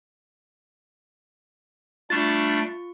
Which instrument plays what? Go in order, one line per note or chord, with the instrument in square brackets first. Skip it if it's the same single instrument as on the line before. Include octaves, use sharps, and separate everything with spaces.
[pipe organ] G3 A3 D4 [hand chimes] F4 C#6 [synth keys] A6